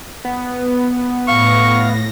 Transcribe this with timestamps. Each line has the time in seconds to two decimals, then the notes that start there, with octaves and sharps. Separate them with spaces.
0.25 B3
1.28 A2 F5 C#6 A#6